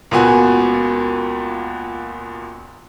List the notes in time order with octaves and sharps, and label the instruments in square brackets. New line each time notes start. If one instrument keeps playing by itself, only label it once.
[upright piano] C#2 A#2 B3 F#4 G#5